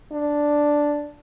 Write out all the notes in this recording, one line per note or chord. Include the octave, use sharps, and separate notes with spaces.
D4